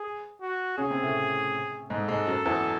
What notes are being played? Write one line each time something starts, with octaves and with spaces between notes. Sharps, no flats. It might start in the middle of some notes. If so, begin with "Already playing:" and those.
Already playing: G#4
F#4
C#3 C#4 G#4
C3 C4
A2 A3
G#2 G#3 A4
G#2 G#3
F#2 F#3
E2 E3